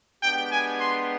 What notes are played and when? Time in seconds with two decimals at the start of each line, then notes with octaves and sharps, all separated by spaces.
0.22 G#3 B3 D4 G4 G5
0.50 G#5
0.80 C6